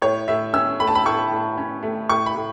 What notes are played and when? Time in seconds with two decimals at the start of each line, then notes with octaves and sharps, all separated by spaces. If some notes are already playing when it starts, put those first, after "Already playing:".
0.02 A2 C#5
0.28 A2 E5
0.53 C#4 E6
0.80 A3 B5
0.87 A5
0.95 B5
1.05 A2 C#6
1.31 A2
1.57 C#4
1.83 A3
2.09 A2 C#6
2.26 B5
2.35 A2